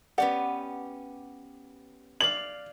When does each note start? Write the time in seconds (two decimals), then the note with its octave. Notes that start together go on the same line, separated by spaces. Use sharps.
0.18 B3 C#4 G4 D5 F#5
2.21 D5 F5 F#7